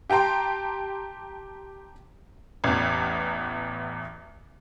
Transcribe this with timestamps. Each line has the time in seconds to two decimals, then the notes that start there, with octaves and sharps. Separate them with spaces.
0.10 G4 G5 A5 A#5 C6
2.64 A1 E2